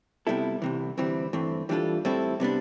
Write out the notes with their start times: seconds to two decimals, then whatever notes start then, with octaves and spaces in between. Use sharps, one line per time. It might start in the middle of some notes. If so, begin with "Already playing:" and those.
0.27 C3 G3 B3 E4 A4
0.62 C2 C3 E3
0.97 D2 C3 E3 G3 C4
1.33 G2 E3 A3 C4
1.69 E3 G3 D4 F4 A4
2.05 A2 G3 C4 E4 A4
2.40 C3 G3 B3 D4